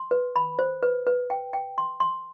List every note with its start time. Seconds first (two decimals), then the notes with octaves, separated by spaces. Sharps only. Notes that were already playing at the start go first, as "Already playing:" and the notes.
Already playing: C6
0.11 B4
0.36 B5
0.59 C5
0.83 B4
1.07 B4
1.30 G5
1.53 G5
1.78 C6
2.00 C6